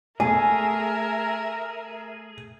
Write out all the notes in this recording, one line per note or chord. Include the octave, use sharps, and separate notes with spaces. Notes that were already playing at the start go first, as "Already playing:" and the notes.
A3 G#4 A#4 E5 G#5